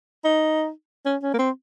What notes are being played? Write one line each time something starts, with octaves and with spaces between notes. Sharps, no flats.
D#4
C#4
C#4
A#3
C4